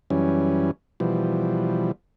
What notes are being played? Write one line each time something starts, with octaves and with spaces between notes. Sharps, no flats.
F#2 E3 G3 C#4
B2 E3 F3 G3